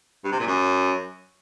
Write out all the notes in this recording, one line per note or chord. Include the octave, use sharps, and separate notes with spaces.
G2
C3
A#2
F#2